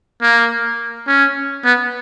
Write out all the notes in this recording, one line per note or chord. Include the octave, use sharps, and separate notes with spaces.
A#3
C#4
B3